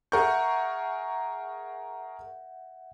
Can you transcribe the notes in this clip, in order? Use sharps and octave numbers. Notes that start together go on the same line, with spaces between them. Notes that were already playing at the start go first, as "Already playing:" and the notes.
G#4 A#4 E5 F#5 C#6 G6